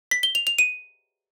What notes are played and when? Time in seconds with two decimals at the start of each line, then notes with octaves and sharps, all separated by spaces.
0.11 B6
0.23 G7
0.35 F7
0.47 F7
0.58 D#7